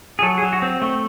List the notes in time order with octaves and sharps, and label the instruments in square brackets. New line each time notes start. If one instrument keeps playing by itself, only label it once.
[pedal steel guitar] G#4
F#3 A4
G#4
F#3
F#4
C4
A3